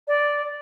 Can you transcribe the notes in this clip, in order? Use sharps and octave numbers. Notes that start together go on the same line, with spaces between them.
D5